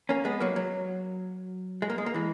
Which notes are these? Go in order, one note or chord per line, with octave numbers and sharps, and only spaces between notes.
A#3 C#4
G#3 B3
F#3 A#3
F#3
G#3
A#3
G#3
A#3
E3 G#3